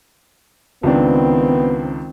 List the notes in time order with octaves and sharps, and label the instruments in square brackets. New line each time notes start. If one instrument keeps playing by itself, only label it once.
[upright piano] C#2 D4 [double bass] D#3 C4 [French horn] B3